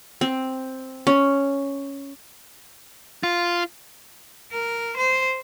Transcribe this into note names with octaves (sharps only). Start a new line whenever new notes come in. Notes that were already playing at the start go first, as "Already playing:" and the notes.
C4
C#4
F4
A#4
C5